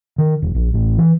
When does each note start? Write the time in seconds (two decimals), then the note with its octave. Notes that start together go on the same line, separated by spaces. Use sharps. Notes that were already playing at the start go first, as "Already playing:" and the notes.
0.18 D#3
0.42 E1
0.55 A#1
0.74 A1
0.98 E3